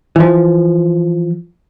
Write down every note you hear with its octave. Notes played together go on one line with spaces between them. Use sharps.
E3 F3